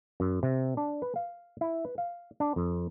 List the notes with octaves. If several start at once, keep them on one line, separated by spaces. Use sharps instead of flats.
F#2
C3
D4
B4
F5
E4
B4
F5
D4
F2